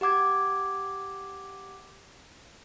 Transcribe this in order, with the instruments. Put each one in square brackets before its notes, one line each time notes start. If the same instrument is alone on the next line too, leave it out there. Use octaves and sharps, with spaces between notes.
[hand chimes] G4 F#5 D6 G#6